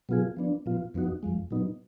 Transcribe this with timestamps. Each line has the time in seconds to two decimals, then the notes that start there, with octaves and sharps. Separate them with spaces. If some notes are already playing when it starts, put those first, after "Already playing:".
0.09 B2 F#3 B3 F4 G#4
0.37 F3 B3 D4
0.66 A#2 F3 B3 F4
0.94 F2 F3 B3 D#4 F#4
1.23 F2 F3 G#3
1.51 A#2 F#3 B3 D#4